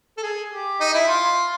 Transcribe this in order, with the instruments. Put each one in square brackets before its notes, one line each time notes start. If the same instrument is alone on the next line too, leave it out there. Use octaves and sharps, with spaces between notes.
[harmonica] A4
G#4
G4
D#4
E4
F4